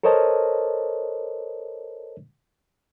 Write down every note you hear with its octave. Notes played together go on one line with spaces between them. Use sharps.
A4 A#4 C5 C#5 D#5 A5